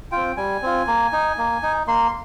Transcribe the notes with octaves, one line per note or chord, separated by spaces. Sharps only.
C4 F4 G5
G3 G#5
C4 F4
A#3
D#4
A#3
D#4
A#3 C6